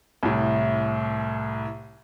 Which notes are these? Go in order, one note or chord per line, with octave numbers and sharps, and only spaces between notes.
C2 A2